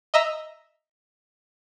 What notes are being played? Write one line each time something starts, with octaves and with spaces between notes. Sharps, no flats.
D#5 E5 A#5 E6